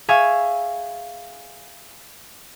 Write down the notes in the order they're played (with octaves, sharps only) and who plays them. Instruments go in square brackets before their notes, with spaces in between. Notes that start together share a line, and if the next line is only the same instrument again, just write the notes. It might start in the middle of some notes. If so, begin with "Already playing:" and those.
[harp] G#4 E5 F5 G#5 C#6